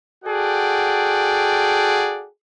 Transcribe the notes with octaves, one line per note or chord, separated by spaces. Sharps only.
F#4 G#4 A4 D5 F#5 G5